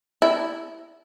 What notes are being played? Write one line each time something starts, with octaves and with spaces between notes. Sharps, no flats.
E4